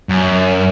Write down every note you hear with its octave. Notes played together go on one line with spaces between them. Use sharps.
F#2